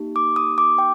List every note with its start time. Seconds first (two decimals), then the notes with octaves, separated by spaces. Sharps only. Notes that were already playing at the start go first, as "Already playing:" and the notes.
Already playing: A#3 D#4 G4
0.16 D6
0.36 D#6
0.58 D6
0.78 G5